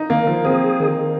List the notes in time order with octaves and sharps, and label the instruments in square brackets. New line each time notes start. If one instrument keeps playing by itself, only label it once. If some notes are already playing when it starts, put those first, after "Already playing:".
Already playing: [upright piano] D#4
[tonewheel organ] D#3 [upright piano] A#3
[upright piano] F3
[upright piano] C4 [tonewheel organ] G#4
[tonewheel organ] D#3